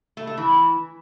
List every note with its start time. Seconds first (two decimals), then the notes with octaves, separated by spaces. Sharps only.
0.17 A3
0.27 A3
0.37 E3